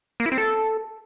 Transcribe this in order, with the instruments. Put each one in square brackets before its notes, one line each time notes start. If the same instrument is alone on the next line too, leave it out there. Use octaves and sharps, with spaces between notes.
[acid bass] A#3
E4
C4
A4